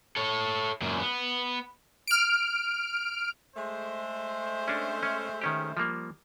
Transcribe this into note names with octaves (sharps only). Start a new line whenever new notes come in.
A4 C#5
F#2 A#2
B3
F6 D7
G#3 A3 C5
C#4 D4
C#4
D#3 C#4 G4
F3 G3 A#3